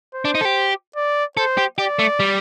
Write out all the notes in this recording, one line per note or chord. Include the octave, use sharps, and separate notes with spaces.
C5
D4
D#4
A4
G4
D5
A4 C5
G4
G4 D5
A3
G3